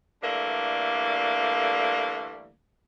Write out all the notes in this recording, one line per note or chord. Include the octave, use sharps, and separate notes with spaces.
D3 E3 G3 A3 A#3